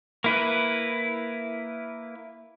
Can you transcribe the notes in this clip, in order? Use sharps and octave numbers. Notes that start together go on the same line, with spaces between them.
A#3 E4 B4